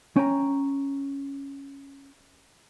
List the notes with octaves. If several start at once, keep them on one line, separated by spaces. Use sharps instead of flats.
C#4 G5 G#5 A#5